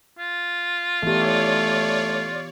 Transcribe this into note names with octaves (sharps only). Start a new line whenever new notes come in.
F4
E3 A3 B3 G4 C#5 D5